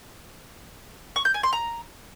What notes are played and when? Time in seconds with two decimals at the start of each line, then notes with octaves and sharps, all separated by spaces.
1.16 C#6
1.25 G6
1.34 G#5
1.43 C6
1.53 A#5